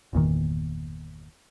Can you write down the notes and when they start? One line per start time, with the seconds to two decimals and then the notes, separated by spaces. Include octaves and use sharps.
0.13 G1 E2 A#2 D#3